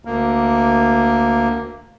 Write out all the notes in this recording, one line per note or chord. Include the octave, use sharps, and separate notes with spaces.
D2 A#3